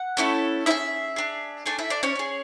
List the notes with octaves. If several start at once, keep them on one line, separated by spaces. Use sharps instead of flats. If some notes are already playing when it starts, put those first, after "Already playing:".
Already playing: F#5
A3 C#4 E4 A4
C#4 E4 G#4 E5
D4 G#4
A3 D4 G#4 G#5
E4 E5
D4 D5
C#4 C#5
C#4 G#4